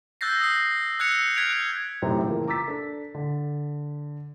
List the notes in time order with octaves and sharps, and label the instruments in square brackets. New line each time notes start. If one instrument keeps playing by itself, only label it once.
[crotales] E6 F#6 G6 A6 A#6 C7
D#6 A#6 C7
E6 F#6 G#6 A#6 C#7 F7
F6 F#6 G#6 B6 D7 F7
F#6 G#6
[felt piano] F#2 A2 C3 G3 C4 D#4
C#3 E3 F3 A#3
A#5 D6 E6 A6 B6
D4 A4
D3